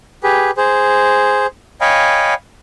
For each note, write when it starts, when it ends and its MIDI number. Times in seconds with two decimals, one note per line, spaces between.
0.24 0.51 67
0.24 0.51 68
0.24 0.51 71
0.57 1.46 68
0.57 1.46 72
1.81 2.34 73
1.81 2.34 75
1.81 2.34 77
1.81 2.34 79
1.81 2.34 80
1.81 2.34 83